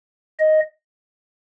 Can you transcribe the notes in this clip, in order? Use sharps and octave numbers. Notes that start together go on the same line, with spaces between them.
D#5